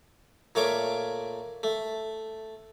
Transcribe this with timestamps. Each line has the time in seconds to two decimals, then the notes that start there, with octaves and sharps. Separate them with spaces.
0.55 A#2 A3 C#5 F5 D6
1.63 A3